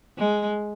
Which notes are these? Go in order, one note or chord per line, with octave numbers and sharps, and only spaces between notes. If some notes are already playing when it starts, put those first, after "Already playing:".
G#3